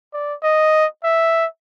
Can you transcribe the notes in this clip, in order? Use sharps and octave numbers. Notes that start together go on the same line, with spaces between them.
D5
D#5
E5